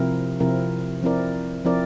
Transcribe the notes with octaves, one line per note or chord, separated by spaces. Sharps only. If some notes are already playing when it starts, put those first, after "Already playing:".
Already playing: C3 F3 C4 E4 A#4
C3 F3 C4 E4 A#4
F3 C4 E4 A#4 D5
F3 C4 E4 A#4 D5